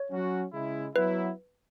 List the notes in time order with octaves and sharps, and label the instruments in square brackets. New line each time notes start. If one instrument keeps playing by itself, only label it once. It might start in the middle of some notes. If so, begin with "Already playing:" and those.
Already playing: [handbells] C#5
[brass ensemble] F#3 C#4 F#4
C#3 G#3 E4
[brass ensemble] F#3 B3 E4 [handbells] B4